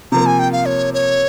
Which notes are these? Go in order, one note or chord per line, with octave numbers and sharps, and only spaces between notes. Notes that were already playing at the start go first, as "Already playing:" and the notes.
C3 F3 A#3 A#5
G#5
G5
F5
C#5
C#5